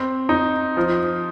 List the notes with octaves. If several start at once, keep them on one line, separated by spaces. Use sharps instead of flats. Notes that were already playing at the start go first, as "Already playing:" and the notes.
Already playing: C4
D#4
F3